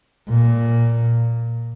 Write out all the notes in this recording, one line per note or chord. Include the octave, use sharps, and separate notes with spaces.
A#2